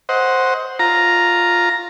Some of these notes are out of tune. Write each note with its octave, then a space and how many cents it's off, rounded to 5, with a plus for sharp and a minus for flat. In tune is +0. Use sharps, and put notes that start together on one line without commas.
C5 +0 D#5 +25 F#5 +0
F4 +0 A#5 +0